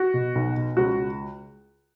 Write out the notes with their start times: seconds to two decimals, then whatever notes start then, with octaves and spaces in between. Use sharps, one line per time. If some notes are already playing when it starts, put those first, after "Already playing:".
Already playing: F#4
0.14 B2
0.35 B1
0.57 B2
0.77 C#2 F#4